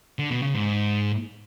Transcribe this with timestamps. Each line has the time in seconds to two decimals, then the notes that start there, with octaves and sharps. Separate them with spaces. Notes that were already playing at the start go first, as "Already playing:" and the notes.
0.19 D3
0.31 B2
0.42 C#3
0.54 G#2